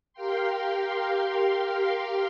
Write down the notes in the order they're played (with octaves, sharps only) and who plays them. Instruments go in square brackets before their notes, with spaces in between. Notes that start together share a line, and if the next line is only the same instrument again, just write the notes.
[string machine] G4 A#4 F5 G5 C6